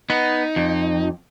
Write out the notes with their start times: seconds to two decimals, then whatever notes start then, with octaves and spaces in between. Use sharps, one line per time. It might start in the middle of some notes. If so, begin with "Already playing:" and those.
0.10 B3 D#4
0.56 F2